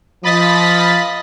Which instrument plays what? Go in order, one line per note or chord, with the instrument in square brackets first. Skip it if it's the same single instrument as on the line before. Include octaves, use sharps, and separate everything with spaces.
[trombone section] F3 [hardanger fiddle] D#5 [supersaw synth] B5 A6 B6